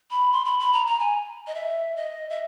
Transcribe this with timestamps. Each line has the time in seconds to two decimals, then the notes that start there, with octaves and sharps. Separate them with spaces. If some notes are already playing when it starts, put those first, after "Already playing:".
0.11 B5
0.32 C6
0.45 B5
0.59 B5
0.73 A#5
0.87 A#5
1.00 G#5
1.47 D#5
1.55 E5
1.96 D#5
2.30 E5